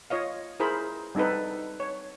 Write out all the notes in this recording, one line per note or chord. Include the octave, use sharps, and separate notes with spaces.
F4 C#5 D#5 F5
E4 G#4 A#4 C5 B5
G3 C4 D#4 A4 B4
C#5